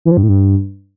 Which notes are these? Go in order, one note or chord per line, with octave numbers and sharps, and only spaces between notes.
E3
F3
G2
A2
G2